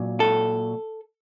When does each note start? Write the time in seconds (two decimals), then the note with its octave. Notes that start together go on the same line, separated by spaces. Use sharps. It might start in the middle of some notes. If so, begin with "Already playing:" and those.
Already playing: A#2 F#3
0.20 A4